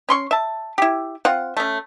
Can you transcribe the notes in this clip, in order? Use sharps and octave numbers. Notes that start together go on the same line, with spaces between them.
C#4 C6 C#6
E5 A5
E4 G4
C4 F4 F#5
A3 C#4